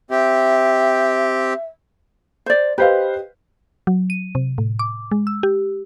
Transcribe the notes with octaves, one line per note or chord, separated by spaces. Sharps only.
C4 G4 E5
C5 D5
G4 B4 C5 D#5 F5
F#3
D#7
C3
A2
D6
G#3
E6
G4